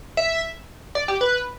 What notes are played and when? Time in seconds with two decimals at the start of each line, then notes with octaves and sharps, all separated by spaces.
0.17 E5
0.95 D5
1.08 G4
1.21 B4